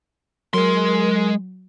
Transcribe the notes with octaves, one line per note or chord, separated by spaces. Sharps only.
F#3 G#3 A#4 C6